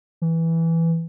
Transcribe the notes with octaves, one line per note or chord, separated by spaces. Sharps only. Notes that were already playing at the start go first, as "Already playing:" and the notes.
E3